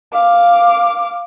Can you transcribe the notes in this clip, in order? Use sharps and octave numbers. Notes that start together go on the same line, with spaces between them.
F5 D6